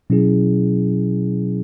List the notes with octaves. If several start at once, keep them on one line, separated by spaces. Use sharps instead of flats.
B2 F#3 C#4 E4 G#4